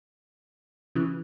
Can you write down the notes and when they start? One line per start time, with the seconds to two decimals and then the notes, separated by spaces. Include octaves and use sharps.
0.95 C#3 E3